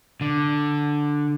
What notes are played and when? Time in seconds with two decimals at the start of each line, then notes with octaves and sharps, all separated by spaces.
0.21 D3